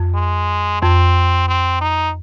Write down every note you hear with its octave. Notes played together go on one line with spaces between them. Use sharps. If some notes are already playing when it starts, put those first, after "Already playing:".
Already playing: F2
G#3
F2 C4
C4
D#4